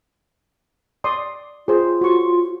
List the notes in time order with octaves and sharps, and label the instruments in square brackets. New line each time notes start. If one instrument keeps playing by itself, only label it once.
[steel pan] D5 C6 D#6
[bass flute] F4 [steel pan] G#4 C5
[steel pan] F#4 C#6